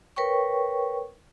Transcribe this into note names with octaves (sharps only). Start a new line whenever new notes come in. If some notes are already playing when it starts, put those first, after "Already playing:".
A#4 B4 C#5 G5 C#6